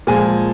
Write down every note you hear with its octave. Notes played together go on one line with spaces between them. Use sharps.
A#2 F3 G#3 G#5